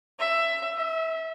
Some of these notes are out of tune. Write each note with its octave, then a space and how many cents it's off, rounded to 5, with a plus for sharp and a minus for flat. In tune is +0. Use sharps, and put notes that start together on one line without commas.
E5 +15
E5 -30